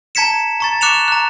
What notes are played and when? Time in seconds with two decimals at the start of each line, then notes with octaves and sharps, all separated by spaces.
0.15 A5 A#5 G#6 B6 C#7 E7
0.60 A#5 C#6 A6
0.81 D6 F#6 C#7 E7 F7
1.08 A#5 F#6